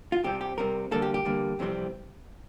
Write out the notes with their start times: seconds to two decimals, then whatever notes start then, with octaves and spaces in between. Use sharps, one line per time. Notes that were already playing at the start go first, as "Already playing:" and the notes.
0.12 F4
0.24 C2 C3 G3 C4 G4
0.41 G4
0.57 C2 C3 G3 C4 A#4
0.92 E2 D3 G3 A#3 A4
1.02 G4
1.14 G4
1.25 E2 D3 G3 A#3
1.59 F2 C3 E3 G3 C4